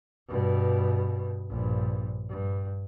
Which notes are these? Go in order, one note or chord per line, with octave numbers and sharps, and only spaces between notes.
G2 B2
A#1 G2
G2